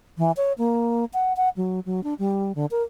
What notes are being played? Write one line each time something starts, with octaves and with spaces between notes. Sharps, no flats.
E3
C#5
A#3
F#5
F#5
F#3
F#3
D4
G3
D3
A#4